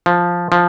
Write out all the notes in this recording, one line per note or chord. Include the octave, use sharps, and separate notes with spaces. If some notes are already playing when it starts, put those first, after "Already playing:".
F3
F3